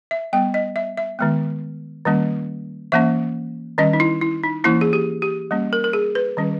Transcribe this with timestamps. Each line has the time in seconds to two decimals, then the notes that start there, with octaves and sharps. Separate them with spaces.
0.11 E5
0.33 G3 B3 G5
0.54 D#5
0.76 E5
0.97 E5
1.19 D#3 G#3 B3
2.05 D#3 G3 A#3 C#4
2.92 E3 A#3 C#4 E5
3.78 D#3 G3 C#4 D#5
3.93 D#4
4.00 E4
4.21 E4
4.43 D#4
4.64 E3 A#3 C#4 E4
4.81 G#4
4.93 G4
5.22 G4
5.51 G3 A#3 C#4
5.73 A#4
5.84 A#4
5.93 G#4
6.15 B4
6.37 D#3 G3 C#4